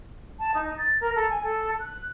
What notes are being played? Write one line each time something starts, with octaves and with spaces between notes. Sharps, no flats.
A5
D#4
A6
A#4
A4
G#5
A4
F#6